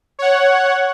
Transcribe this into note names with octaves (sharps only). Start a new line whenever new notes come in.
C#5 F#5